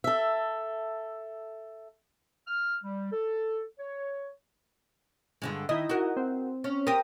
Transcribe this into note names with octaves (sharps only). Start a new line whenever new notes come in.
A4 E5
F6
G3
A4
C#5
G2 D3 G#3
D#3 D#4 E4 D#5
F#4 A#4
C4
C#4
C4 G4 A#4 D#6 A#6